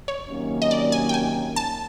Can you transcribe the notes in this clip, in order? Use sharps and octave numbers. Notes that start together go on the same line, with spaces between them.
C#5
C3 D#3 F#3 A#3 C#4
D#5
D5
G#5
G5
G#5
A5